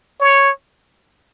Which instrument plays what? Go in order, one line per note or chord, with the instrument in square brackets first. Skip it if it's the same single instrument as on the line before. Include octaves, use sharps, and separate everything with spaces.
[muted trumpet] C#5